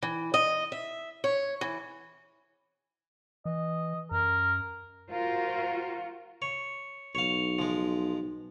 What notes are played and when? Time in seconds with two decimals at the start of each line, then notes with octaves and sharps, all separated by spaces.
0.02 E3
0.34 D#5
0.72 E5
1.24 C#5
1.61 E3
3.46 E3 D#5
4.11 F#2 A#4
5.11 F4 F#4 A#4 C5
6.42 C#5
7.15 B1 C#5 F5
7.59 F3 G#3